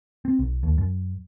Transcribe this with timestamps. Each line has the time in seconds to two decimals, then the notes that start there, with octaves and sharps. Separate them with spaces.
0.25 C4
0.39 B1
0.63 D#2
0.78 F#2